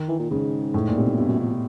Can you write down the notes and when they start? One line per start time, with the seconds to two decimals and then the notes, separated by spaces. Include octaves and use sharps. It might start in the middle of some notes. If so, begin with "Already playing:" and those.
Already playing: D#3
0.08 E3
0.19 A#2
0.30 G#2 C#3
0.74 A2
0.89 A#2
0.97 C3
1.03 B2
1.17 G2 B2
1.29 F#2
1.40 F2